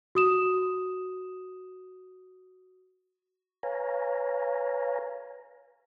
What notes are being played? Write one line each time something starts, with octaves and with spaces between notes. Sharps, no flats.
F#4 D#6 E7
B4 C#5 F5 G#5 A#5